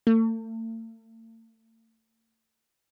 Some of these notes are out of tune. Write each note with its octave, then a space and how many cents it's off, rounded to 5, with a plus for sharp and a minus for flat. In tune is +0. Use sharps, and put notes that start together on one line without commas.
A3 +40